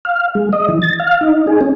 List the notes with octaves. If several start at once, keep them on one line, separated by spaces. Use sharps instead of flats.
F5
G#3
D#5
E3
A6
F5
D#4
G#4
C#4